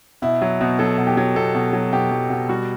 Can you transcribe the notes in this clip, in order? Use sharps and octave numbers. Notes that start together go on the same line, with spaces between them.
B2 E4
F#3
B2
F#3 A4
B2
G4
F#3
B2 A4
B2
F#3
B2 G4
F#3
B2
G3 F#4